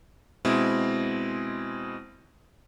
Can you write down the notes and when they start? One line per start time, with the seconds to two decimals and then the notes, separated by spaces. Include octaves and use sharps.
0.45 B2 G#3 C4 E4